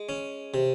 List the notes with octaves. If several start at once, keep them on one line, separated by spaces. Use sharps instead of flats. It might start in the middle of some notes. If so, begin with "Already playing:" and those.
Already playing: G#3
C#4
C3